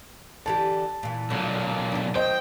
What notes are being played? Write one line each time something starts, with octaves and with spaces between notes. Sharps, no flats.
D3 E3 G4 A5
A#2 E3
B1 A#2 D3
B3 D4
D#3 F#3 C5 D#5 G5